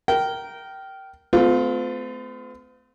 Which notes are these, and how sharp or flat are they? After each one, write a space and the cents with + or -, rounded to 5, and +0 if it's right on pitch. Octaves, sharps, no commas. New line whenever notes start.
A#4 +0 G5 -20
A3 -15 C4 -45 F4 +20